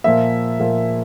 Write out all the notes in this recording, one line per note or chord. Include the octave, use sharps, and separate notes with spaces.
A#2 F3 A#3 E5
A#2 F3 A#3